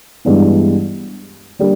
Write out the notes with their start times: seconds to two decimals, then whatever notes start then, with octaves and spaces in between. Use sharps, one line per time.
0.25 G2 E3 G#3 B3 D4
1.59 G3 A#3 D4